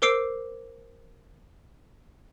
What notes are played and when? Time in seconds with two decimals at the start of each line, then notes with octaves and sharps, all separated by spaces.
0.02 A#4 C5 D6 E6 C7 D7